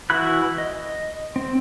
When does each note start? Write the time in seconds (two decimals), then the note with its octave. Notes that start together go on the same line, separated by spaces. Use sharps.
0.10 E3 E4 F#4 B5 F#6
0.58 D#5
1.36 C4